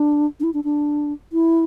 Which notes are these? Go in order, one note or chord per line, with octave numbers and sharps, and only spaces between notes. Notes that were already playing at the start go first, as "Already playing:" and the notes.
Already playing: D4
D4
E4
D4
D4
E4